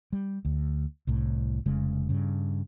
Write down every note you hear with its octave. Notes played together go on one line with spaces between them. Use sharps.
G3
D2
C2 A2
F1 C#3 G#3
G2 C#3